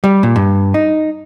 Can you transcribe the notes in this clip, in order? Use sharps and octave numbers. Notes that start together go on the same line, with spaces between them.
G3
A#2
G2
D#4